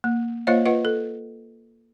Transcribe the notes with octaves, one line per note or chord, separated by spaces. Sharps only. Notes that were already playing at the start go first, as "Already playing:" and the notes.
A#3
A#3 F4 C5 C#5 D#5 F5
F4 B4 D#5 F#5
A4